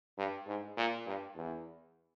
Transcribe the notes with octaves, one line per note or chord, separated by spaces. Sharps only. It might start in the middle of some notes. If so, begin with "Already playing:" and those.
G2
G#2
A#2
G2
E2